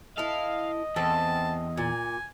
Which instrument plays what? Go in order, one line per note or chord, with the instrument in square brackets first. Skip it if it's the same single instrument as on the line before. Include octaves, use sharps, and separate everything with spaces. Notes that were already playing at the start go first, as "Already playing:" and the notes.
[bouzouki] E4 A4 [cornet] D#5 [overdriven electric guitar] F5
[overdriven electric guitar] E2 [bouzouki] C4 A4 [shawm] A5
[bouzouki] A#2 [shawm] G#5